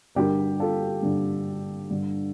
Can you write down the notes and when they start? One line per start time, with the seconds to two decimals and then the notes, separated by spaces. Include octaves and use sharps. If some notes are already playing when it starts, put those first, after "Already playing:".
0.15 G2 D3 G4 A#4
0.59 F4 A4
1.02 G2 D3
1.90 G2 D3